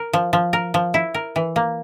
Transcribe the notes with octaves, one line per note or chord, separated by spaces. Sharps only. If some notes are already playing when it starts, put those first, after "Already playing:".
Already playing: A#4
F3
F3
A#4
F3
E4
A#4
E3
A#3